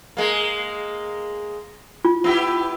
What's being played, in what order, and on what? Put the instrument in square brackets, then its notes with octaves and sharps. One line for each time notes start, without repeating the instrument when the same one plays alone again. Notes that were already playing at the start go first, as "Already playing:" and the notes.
[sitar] G#3 A#3
[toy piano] F4
[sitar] B3 E4 G4